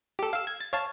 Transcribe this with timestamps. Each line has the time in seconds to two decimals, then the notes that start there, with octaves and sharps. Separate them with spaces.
0.19 G4 A4
0.33 F5 E6
0.47 G#6
0.60 A6
0.73 C#5 F5 A5